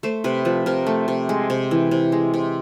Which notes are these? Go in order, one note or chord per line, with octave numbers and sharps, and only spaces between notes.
A3 C5
C3 B4
F3 B4
C3 A#4
A3
C3
G#3
C3
E3
C3
G#3
C3